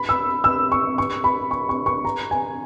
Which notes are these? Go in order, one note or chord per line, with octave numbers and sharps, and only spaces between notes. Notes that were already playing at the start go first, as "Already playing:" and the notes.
Already playing: B5
E6
E6
C#6
C#6
B5
C#6
C#6
C#6
A#5
G#5